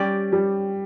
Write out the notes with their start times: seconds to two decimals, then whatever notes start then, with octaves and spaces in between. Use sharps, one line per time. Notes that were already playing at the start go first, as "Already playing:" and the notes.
Already playing: G3 C#4 G4 D5
0.32 G3